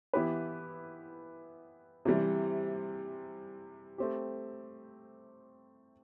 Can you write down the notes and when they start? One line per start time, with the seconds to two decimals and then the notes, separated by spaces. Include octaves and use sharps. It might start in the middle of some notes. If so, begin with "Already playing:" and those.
0.13 E3 B3 E4 G4 B4
2.05 C3 E3 G3
3.98 A3 C4 G4